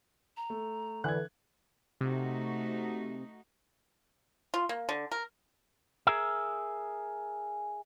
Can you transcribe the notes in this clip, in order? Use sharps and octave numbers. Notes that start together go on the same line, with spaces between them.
A#5
A3
D3 E3 F#6 G#6
C3 A3 D#4 F#4
F4
A#3
D3
A#4
G#4 A#4 E5